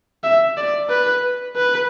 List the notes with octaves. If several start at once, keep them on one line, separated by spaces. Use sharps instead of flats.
E5
D5
B4
B4